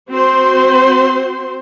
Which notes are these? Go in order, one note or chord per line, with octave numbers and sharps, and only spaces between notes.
C4 F#4 C5 C6